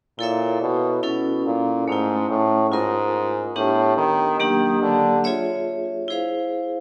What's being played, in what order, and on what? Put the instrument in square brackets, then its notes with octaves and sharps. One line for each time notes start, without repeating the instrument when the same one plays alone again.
[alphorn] A#2 [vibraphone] E4 A4 C#5 E5
[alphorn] B2
[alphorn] B2 [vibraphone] C#4 E4 A4
[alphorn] A#2
[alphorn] G#2 [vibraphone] A3 C#4 E4
[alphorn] A2
[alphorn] G#2 [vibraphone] F4 A#4 D#5
[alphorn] A2 [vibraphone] B3 D4 G4
[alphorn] D#3
[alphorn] D#3 [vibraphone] F#3 A#3 D4 G4
[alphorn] D3
[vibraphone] F4 G#4 C#5 E5
E4 G#4 C5 F5